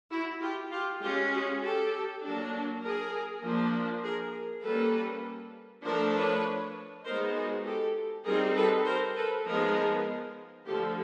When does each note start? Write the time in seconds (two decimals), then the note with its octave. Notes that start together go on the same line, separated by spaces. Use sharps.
0.11 E4 F#4
0.41 F4 G4
0.71 F4 G4
1.01 G#3 C#4 F4 G4
1.31 F#4 G#4
1.61 G4 A4
2.22 F#3 A#3 D4
2.82 G#4 A#4
3.42 F3 A#3 D4
4.03 G#4 A#4
4.62 G3 A#3 C#4 A4 B4
5.84 F3 A3 D4 A#4 C5
6.13 B4 C#5
7.04 G#3 B3 D#4 A#4 C5
7.34 F#4 G#4
7.64 G4 A4
8.25 G3 C4 D#4 G#4 A#4
8.55 A4 B4
8.85 A#4 C5
9.15 A4 B4
9.45 F3 G#3 B3 D#4 G#4 A#4
10.66 D3 F3 A3 G4 A4